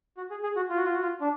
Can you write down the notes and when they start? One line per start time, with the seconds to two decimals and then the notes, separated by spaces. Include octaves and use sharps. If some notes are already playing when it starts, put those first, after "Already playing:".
0.17 F#4
0.30 G#4
0.43 G#4
0.56 F#4
0.69 F4
0.77 F#4
0.85 F4
0.93 F#4
1.02 F4
1.21 D4